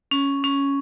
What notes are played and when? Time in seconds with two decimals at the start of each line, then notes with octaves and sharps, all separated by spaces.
0.11 C#4
0.44 C#4